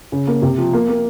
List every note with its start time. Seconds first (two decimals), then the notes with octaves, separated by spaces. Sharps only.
0.12 C#3
0.27 A#3
0.42 C3
0.58 F3
0.73 A#3
0.88 A#3